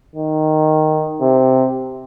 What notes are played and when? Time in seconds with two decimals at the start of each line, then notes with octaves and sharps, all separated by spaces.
0.15 D#3
1.21 C3